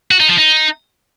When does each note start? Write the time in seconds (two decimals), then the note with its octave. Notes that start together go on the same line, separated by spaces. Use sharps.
0.11 F#4
0.20 D#4
0.29 F3
0.38 D#4